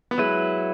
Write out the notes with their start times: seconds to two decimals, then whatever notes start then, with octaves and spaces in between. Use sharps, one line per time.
0.11 B3
0.18 F#3 G#3 E4 B4